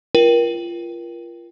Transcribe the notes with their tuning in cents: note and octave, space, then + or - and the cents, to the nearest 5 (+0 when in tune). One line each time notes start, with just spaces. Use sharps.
F4 -25 A#4 +30 G5 +0